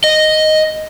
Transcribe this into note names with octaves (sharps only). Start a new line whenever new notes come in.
D#5